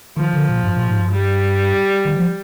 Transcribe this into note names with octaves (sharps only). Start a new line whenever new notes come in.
D#3 F3
D3
A#2
G2
A#2
G#2
G2
G3
D#3
F3